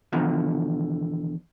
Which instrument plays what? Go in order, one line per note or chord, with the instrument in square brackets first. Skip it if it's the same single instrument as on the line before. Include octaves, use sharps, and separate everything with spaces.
[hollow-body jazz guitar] E2 B2 D3 D#3 F3